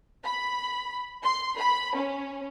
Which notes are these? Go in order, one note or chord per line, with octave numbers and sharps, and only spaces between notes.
B5
C6
B5
C#4